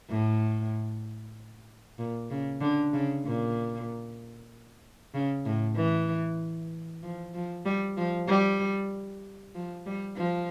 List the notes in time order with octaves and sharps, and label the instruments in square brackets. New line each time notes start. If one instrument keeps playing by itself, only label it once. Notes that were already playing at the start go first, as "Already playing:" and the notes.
[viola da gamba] A2
A#2
C#3
D3
C#3
A#2
C#3
A2
E3
F3
F3
G3
F3
G3
F3
G3
F3